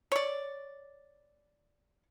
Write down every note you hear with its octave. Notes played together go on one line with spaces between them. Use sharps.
C#5 D5